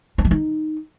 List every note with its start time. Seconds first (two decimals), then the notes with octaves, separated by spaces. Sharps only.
0.18 D4
0.25 E3
0.31 D#4